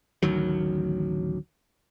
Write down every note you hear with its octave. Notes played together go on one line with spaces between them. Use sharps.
A1 D2 D#3 F#3